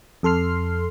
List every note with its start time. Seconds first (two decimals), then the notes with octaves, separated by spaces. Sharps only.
0.23 F2 A4 C6 F6 C7